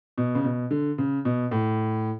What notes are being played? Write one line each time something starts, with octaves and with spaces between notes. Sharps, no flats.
B2
C#3
B2
D3
C#3
B2
A2